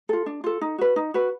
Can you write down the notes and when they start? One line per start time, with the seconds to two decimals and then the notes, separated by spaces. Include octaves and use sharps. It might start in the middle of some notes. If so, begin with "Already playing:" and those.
0.09 F4 A4
0.26 D4
0.44 F4 A4
0.61 D#4
0.78 F#4 B4
0.96 D#4
1.14 F#4 B4